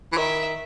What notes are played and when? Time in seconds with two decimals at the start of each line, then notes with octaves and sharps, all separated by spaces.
0.13 E3
0.18 D#3 E5